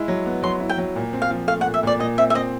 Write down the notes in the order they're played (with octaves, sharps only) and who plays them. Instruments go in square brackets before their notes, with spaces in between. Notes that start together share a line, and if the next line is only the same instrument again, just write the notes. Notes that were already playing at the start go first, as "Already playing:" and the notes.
Already playing: [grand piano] G#3 E4
F#3
B3
[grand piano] F#3 [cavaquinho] C6
[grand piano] E4
[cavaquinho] G5
[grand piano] F#3
A#2
C4
[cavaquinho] F5
[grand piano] F3
[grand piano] A3 [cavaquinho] F5
[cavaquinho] F#5
[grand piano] A#2
[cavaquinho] E5
[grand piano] A#2 [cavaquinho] D5
[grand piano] A#2 [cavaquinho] D#5
[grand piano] C4 [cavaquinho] E5
[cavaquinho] E5
[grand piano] C4 [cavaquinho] D#5